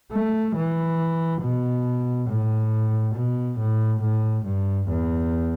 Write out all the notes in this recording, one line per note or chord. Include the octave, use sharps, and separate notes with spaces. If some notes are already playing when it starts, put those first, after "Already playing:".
A3
E3
B2
A2
B2
A2
A2
G2
E2